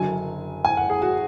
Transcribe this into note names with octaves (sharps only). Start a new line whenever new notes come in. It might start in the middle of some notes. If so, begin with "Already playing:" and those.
Already playing: F#1 F#2 D3 G#5
G#5
F#5
G#4
F#4